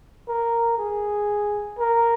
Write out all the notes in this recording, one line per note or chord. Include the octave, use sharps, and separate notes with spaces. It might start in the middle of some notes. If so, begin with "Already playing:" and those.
A#4
G#4
A#4